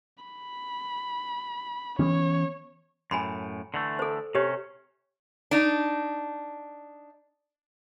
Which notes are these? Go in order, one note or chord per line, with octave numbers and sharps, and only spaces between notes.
B5
E3 B3 C#4 C#5
F#2 A2 G#5 B5 C6
D3 E3 A3
A4 C5
C3 C#4 G4 C#5
D4 D#4